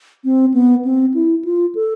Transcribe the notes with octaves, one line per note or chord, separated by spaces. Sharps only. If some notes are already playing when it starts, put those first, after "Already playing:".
C4
B3
C4
E4
F4
A4